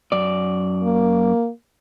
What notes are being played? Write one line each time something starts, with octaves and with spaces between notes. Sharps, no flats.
F#2 D5
A#3